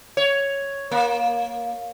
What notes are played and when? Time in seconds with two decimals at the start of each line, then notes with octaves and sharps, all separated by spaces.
0.17 C#5
0.91 A#3